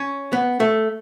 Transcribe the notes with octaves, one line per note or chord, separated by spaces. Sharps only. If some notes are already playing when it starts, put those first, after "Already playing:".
Already playing: C#4
B3
A3